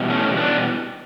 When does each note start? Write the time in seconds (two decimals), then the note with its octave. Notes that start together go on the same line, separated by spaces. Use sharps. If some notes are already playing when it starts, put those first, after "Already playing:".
Already playing: E2 B2 G3
0.10 A3 C#4
0.37 B3 D4